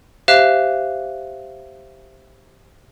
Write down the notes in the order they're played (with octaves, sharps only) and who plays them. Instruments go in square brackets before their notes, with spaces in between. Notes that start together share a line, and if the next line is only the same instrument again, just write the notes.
[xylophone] G4 C5 E5 F5 F#6 E7